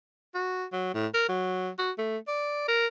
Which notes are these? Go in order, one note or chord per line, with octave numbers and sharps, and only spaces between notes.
F#4
F#3
A2
A#4
F#3
F#4
A3
D5
A#4